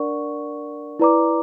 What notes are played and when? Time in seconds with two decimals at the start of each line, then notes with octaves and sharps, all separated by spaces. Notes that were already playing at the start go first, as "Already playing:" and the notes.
Already playing: D4 A#4 D5 F#5 C#6
0.99 E4 B4 D5 A#5 D6